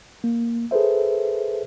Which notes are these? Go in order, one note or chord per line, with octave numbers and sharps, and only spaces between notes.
A#3
G#4 A4 B4 C5 E5